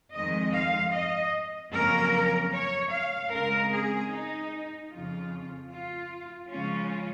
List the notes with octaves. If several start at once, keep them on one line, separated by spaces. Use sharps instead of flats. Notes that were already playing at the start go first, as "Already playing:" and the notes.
F2 D#3 G#3 C4 D#5
F5
D#5
F2 C#3 F#3 A#3 C#4 A#4
C#5
F5
C#3 G#3 C4 A#4
G#4
D#4
F2 C#3 F3 F4
F4
C#3 F3 G#3 C#4 F4